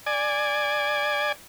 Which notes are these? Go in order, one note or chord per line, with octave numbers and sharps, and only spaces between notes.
D5 G#5